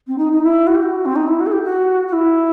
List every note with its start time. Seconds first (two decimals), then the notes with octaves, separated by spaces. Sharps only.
0.07 C4
0.18 D#4
0.32 D#4
0.43 E4
0.67 F#4
0.75 G4
0.82 F#4
1.05 C4
1.16 D#4
1.28 E4
1.40 F#4
1.46 A4
1.52 G4
1.64 F#4
2.07 F#4
2.13 E4